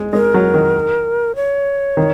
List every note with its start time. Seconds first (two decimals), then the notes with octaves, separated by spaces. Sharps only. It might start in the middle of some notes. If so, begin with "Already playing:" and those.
Already playing: G#3
0.13 G#3 A#4
0.34 F#3
0.54 D#3
1.36 C#5
1.97 D#3